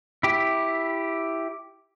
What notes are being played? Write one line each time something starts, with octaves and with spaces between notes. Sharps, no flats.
E4 G4